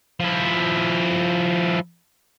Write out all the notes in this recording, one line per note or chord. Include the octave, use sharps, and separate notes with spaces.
F3 E4